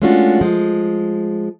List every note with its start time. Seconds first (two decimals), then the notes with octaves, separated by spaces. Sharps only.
0.02 G#3 A3 C#4 D4 F4 F#4
0.41 F3 G#3